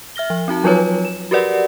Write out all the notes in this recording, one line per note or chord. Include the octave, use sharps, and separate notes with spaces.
E5 F6 A#6 G7
F3
C4 D#4 F#4 A5
F3 F#3 F4 B4 C#5
E7
F#4 G4 A#4 B4 D5 F#5